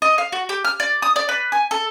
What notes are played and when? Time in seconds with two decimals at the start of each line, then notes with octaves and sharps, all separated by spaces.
0.02 D#5
0.18 F5
0.32 F#4
0.49 G4
0.64 F6
0.80 D5
1.02 D#6
1.16 D5
1.29 B4
1.52 G#5
1.71 A4